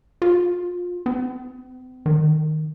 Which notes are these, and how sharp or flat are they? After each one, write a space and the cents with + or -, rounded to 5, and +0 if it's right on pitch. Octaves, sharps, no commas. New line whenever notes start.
F4 +25
C4 -45
D#3 -5